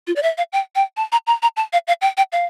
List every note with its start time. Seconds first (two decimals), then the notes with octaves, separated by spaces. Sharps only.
0.07 F4
0.16 D5
0.23 E5
0.38 F5
0.52 G5
0.75 G5
0.97 A5
1.12 A#5
1.27 A#5
1.42 A#5
1.57 A5
1.73 F5
1.87 F5
2.01 G5
2.17 G5
2.32 F5